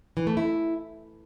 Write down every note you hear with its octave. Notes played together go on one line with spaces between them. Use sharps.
E3
A3
E4